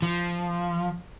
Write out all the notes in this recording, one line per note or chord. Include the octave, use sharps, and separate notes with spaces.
F3